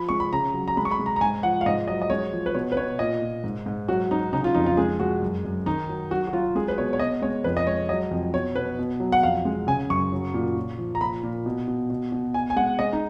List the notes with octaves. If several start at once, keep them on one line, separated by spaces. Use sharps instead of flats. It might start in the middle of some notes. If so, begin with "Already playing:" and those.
Already playing: F3 B5
G#3 C#6
B5
C#3 A#5
F#3
A#5
G#3 B5
C#6
B5
G#3
A#5
A#5
G#2 G#5
F3 F#5
F5
G#2 D#5
F#3 D#5
D#5
G#3 C#5
F3
B4
B2 C#5
B4
B2 C#5
A#2 D#5
A#2
G#2
G#2
F#3 F#4
F#3 D#4
C#3 D#4
F4
F2 D#4
F4
G#3 G#4
G#3 F#4
F#2
F#2
D#3 D#4
F#3
F#3 F#4
F#4
F#3 F4
G#3 G#4
B4
B2 C#5
C#5
B2 D#5
G#3 C#5
F2 B4
D#5
G#3 C#5
F#3 D#5
F2
B2 C#5
B2 B4
B2
F#3
F#5
F2 F5
G#3
C#3 G#5
F#2 C#6
F#3
A#2
A#2
F3
A#5
A#2 B5
A#2
B2
B2
B2
B2
B2 G#5
G#5
G#3 F#5
G#3 D#5
D#4